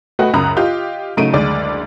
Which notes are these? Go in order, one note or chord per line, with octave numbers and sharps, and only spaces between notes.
A3 F#4 B4 D#5 F#5 G5
C#2 F#2 A#5 B5 D#6 F#6
F4 G4 D#5 G6
C#3 F#3 A3 D#4 D7 D#7
F#1 D2 G#3 D5